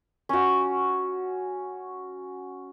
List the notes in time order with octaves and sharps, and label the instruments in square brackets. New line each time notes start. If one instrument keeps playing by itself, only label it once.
[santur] C#4 F#4